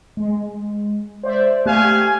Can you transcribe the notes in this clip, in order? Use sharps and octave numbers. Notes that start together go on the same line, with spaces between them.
G#3
C5 D5 E5
A3 G4 F5 G#5 F#6